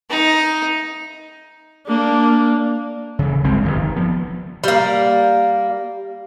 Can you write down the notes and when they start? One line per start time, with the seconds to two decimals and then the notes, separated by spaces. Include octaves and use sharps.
0.10 D#4
1.86 A#3 D4
3.19 C#3 E3
3.44 G1 C2 G#3 C4
3.63 G1 F2
3.79 D#3
3.96 F3 B3
4.64 G3 A#3